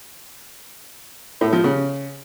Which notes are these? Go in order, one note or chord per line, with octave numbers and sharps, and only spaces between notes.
A2
F3
C#3